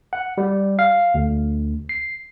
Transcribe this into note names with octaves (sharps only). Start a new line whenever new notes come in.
F#5
G3
F5
D2
C7